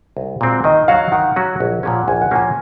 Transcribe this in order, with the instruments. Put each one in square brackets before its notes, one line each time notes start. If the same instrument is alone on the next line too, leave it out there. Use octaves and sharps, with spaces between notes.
[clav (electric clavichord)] C2
A#2 G#3 C4 F#4
[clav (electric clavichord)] D#3 [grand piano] D#5
[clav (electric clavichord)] F#3 C#4 F#4 [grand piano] F5
[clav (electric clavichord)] D#3 [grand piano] F#5
[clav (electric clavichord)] F#3 C#4 F#4
A#1
A#2 F3 A#3 C#4
[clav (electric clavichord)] A#1 [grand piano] G#5
[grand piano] F#5
[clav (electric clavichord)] A#2 F3 A#3 C#4 [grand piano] G#5